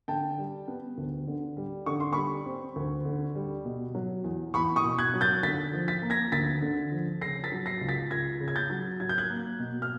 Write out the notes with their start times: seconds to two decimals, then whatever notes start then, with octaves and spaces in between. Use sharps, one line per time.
0.08 D3 G5 A5
0.38 G3
0.68 B3
0.98 D2
1.28 D3
1.57 G3
1.86 D3 C#6
2.00 C6
2.12 G3 B5 C#6
2.46 C4
2.76 D2
3.05 D3
3.35 G3
3.65 B2
3.95 F#3
4.24 E2
4.54 E2 B5 C#6
4.76 C#6 D#6
4.84 B2
4.98 F#6 G#6
5.14 F#3
5.21 G6 A6
5.43 D3 A6 B6
5.73 F3
5.88 A6 B6
6.03 A#3
6.10 G#6 A#6
6.32 D2 A6 B6
6.62 D3
6.92 F3
7.21 C#3 A#6 C7
7.44 A6 B6
7.52 F#3
7.66 A#6 C7
7.81 C#2
7.89 A6 B6
8.11 C#2 G#6 A#6
8.41 C#3
8.48 G#6
8.56 G6 A6
8.70 F#3
9.00 F#3 G#6
9.09 G6
9.18 F#6 G#6
9.30 A#3
9.59 B2
9.82 F6